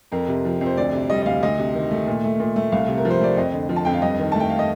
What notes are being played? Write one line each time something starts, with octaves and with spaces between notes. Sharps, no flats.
F2 A#4
C3
F3
F2
C5
D2 D5
C3
G3 D#5
D#5
D2 F5
D2 D#5
C3
D#3
A3
A#2
A3
A#2
A3
C2 F5
C3
A#4
F3
C5
A3 D5
F2 D#5
D3
F3
A5
F2 G5
F5
G2 D#5
D#3
A3 A5
G5
F5
D#5